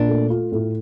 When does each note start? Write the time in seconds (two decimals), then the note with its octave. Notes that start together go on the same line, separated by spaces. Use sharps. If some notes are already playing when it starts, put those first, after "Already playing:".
Already playing: A#2 D4
0.09 A3
0.30 F4
0.52 A2